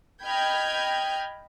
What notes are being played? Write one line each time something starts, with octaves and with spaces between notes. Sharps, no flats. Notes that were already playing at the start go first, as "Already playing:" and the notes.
D#5 G5 B5 F6 G6 G#6